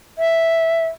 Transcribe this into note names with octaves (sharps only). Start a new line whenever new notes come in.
E5